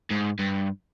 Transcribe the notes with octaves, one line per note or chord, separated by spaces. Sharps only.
G#2
G2